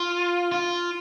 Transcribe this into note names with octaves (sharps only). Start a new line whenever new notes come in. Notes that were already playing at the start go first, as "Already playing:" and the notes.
Already playing: F4
F4